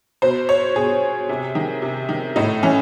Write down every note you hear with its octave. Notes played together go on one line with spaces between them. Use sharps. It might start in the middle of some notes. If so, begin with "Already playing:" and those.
B2 C5
C#5
B2 G#4
C3
D#3
C3
D#3
A2 D#4
E3 C#4